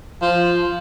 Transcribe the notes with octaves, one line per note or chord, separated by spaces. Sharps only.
F3